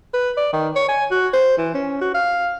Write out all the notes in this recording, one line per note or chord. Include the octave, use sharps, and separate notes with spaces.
B4
D5
D#3
C#5
G#5
F#4
C5
E3
C#4
F#4
F5